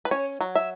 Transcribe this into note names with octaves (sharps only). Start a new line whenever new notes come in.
B4
C#4 C#5
F#3
E5